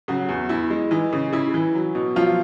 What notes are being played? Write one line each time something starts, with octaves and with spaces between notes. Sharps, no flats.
C#3 F#3 F#4
E2
E2 E4
G#3
E3 D#4
C#3
C#3 E4
E3
F#3
B2
F3 F#3 F4